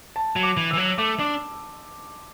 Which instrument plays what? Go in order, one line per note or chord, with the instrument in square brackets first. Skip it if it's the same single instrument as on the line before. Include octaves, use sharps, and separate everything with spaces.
[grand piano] A5
[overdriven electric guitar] F#3
[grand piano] D6
[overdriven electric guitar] E3
[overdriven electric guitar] E3 [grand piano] E6
[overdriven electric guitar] F#3
[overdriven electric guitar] A3 [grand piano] D6
[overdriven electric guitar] D4 [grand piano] D6